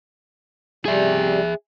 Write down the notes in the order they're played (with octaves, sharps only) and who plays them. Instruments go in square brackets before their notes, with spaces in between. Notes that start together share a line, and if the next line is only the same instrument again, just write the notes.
[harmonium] C3 G3 [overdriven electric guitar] G#4 E5